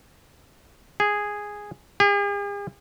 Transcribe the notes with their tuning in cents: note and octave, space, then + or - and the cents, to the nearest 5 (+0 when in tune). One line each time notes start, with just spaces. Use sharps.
G#4 -5
G#4 -45